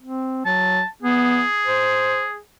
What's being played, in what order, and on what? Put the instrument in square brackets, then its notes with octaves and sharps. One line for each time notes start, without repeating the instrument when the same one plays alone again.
[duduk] C4
[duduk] F#3 [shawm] A5
[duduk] B3 [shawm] G#4
[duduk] C5